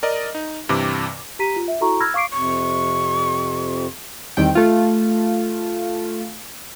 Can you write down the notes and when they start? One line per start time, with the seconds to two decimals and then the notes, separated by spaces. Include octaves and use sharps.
0.03 A#4 D5 D#5
0.35 D#4
0.69 G2 C3 E3 D6
1.39 G4 A#5 B6 D#7
1.56 F4
1.68 E5
1.81 E4 F#4 A4 A#5 C#6
2.00 B5 E6 F6 G#6 A#6
2.14 F5 C#6 D6 C7 D7
2.31 F2 C3 C#6
4.37 E2 D#3 G3 C4 G5 D7
4.55 A3 F4